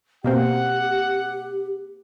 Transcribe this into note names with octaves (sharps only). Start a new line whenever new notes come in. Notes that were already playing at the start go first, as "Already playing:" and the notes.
B2 A#3 C4 G4 F#5